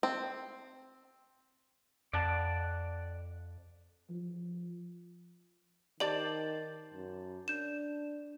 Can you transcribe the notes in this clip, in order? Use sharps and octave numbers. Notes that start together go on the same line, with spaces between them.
C4
F2 D5 F#5 A5
F3
D#3 G4 C5 D5 A5 D6 F#7
F#2
D4 G6 E7